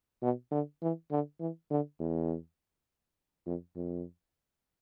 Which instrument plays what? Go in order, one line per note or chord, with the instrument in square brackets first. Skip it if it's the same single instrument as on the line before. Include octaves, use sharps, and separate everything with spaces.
[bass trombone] B2
D3
E3
D3
E3
D3
E2
F2
F2